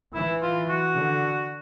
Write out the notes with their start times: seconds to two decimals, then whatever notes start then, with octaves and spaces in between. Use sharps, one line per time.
0.14 E3 E4
0.42 F4
0.69 F#4
0.97 D3